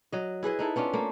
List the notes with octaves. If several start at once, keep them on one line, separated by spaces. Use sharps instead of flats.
F#3 D#5
E4 G#4 B4 D#5
D#4 E4 A4
B3 C#4 D4 F4
A3 A#3